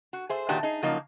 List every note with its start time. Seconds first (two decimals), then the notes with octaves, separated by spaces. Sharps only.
0.13 F#4
0.29 G#4 C5 E5
0.49 A#2 D#3 D4 F#4 G4 B4
0.63 D#4 G#4
0.83 C#3 F3 F#3 A#3 D#4